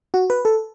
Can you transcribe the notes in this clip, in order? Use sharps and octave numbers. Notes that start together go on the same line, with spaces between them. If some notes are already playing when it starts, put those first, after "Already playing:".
F#4
B4
A4